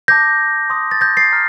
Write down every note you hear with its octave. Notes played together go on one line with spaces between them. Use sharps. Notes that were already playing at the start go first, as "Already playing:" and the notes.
A5 D6 G6 A#6
C6 D#6 G6
A6
G6 A#6
A6 C7
A#5 F6